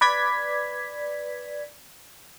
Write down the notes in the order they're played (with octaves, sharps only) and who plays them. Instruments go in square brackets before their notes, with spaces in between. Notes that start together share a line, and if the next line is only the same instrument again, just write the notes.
[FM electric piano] B4 D5 G#6 B6